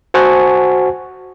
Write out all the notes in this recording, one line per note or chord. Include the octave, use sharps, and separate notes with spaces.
F#4 C5 F#5 G#5 A5 C#6